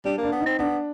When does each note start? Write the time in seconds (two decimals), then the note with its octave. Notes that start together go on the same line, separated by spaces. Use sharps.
0.05 G3 D4
0.18 A#3
0.23 D4
0.32 B3
0.41 D#4
0.46 C4
0.59 B3 D4